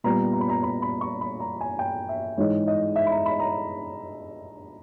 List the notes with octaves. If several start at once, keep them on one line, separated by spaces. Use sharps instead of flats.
A#2 G3 B3 A#5
A#5
B5
A#5
B5
B5
C#6
B5
A#5
G#5
G5
E5
G#2 E3 G#3 D#4 C#5
D#5
E5
B5
A#5
B5
A#5